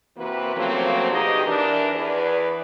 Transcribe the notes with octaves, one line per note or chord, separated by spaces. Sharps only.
C3 E3 A#3 C4 F#4 B4
C#3 F3 F#3 A3 A#3 C4
G2 B2 D#4 G4 G#4 D#5
E3 D4 A#4
E2 E3 G#4 B4 D5